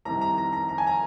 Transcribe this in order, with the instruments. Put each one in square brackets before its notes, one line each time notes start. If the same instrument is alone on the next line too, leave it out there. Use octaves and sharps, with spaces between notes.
[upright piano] C2 C3 D#3 A#5
A#5
A#5
A#5
A#5
G#5
A#5